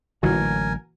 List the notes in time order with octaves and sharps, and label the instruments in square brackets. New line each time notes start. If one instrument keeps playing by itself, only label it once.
[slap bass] A1 D3 F#3 [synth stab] A#2 E3 F#4 [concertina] A#4 G#5